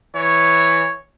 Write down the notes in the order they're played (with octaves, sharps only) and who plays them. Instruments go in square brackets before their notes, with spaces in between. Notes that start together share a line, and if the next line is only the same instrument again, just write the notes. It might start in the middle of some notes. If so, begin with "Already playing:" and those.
[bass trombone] E3 [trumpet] C#5